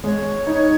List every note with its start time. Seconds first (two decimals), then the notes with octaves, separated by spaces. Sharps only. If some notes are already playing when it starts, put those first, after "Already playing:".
0.04 G#3 C#5
0.47 D#4